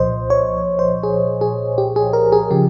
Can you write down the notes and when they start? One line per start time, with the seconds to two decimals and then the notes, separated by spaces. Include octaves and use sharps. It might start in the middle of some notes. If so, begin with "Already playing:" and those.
Already playing: C2 A#2 F3 C5 D#5
0.30 C#5
0.79 C5
1.03 G#4
1.41 G#4
1.78 G4
1.96 G#4
2.13 A#4
2.32 G#4
2.51 C#3 F3 G4